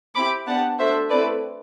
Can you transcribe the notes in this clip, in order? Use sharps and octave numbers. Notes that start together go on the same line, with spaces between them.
C4 E4 G4 B5 D6
B3 D4 G4 F#5 A5
A3 D4 F#4 C5 E5
A3 C4 E4 A4 B4 D5